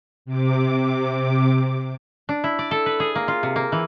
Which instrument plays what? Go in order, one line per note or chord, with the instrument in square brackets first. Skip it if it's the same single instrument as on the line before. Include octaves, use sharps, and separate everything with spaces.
[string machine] C3 D6
[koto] D4
E4
D5
A4
B4
G#4
A#3
F4
C3
A#3
E3